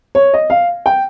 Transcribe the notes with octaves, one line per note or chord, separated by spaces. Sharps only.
C#5
D#5
F5
G5